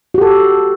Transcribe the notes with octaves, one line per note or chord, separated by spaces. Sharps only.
F#4 G4 A4